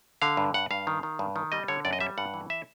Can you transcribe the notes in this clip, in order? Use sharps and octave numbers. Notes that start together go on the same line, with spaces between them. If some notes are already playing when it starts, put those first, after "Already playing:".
D3 F5
G2
G2 F#5
G2 F5
D#3
D#3
G2
D#3
G3 D#5
D3 C#5
F#2 D5
D#5
G3 E5
G2 F#5
E3
E5